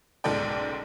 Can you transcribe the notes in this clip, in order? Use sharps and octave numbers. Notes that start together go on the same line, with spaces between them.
F#1 B1 G#2 A4 D5 G5